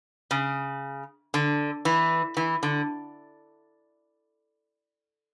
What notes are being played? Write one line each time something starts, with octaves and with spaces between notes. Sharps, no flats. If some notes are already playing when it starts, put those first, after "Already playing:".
C#3
D3
E3
E3
D3